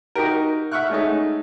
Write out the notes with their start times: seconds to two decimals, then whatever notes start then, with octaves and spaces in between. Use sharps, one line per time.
0.15 D#4 F#4 G4 A#4
0.71 E5 F#5 C#6 F6 F#6
0.90 G#3 A3 C#4 D#4